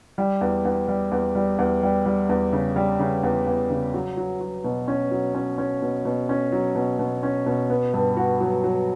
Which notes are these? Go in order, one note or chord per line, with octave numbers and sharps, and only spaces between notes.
G3
E2
E2
G3
E2
G3
E2
G3
G3
E2
C#3
G3
C#3
E2
E2
C#3
F#3
F#3
F#3
B2
C#4
F#3
C#4
C#4
B2
B2
C#4
F#3
B2
B2
C#4
B2
B3
G2
F#4
F#3
F#3